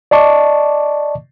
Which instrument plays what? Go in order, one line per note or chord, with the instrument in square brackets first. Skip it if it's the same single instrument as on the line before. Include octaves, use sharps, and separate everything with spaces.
[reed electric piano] D5 D#5 A5 C#6 D6